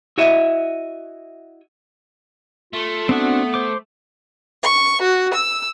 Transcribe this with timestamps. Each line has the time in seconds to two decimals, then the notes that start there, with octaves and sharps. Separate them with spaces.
0.18 E4 F#4 C#5 D#5 E5
2.73 A3 F4
3.09 B3 C4 D4 F#4
3.54 C5 D6
4.61 C#6
5.00 F#4
5.33 E6